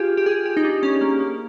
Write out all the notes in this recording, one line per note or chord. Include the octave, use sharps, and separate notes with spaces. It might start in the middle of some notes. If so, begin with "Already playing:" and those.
Already playing: F4 G4 G#4
G4
G#4
G4
D#4
D4
C#4
A#3
A#3